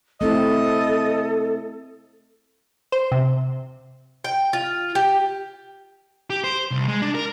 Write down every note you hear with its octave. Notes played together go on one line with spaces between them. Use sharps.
A3 C4 E4 A4 D#5
C5
C3
G5
F4
G4
G4
C5
C2
G#3
D4
A#4